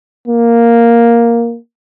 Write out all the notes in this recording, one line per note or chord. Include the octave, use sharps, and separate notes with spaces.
A#3